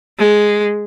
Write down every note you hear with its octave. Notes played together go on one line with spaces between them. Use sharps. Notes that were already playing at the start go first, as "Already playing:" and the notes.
G#3